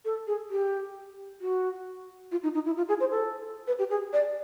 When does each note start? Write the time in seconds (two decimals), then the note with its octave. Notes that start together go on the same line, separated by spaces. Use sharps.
0.05 A4
0.27 G#4
0.50 G4
1.41 F#4
2.32 F4
2.43 D#4
2.54 D#4
2.66 E4
2.77 F4
2.88 G#4
3.00 C5
3.11 A4
3.67 B4
3.79 G4
3.90 G#4
4.13 D5